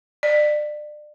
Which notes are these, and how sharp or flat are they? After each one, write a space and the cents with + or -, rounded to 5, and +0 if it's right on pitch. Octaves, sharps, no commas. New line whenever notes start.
D5 +30